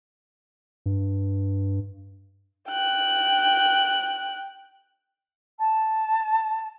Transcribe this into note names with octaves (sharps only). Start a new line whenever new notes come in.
G2
G5 F#6
A5